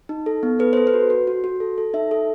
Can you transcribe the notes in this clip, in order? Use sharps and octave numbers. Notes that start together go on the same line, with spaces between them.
D#4
A4
B3
A4 B4
A4 C5
B4
F#4
F#4
F#4
F#4
A4
A4
D#4 E5
A4